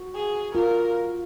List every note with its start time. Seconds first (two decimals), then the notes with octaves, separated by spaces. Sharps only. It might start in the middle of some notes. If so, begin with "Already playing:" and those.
Already playing: F#4
0.15 G#4
0.55 F4 A#4